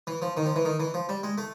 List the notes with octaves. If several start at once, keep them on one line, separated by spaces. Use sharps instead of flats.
E3
F3
D#3
F3
E3
D#3
E3
F3
G3
G#3
A3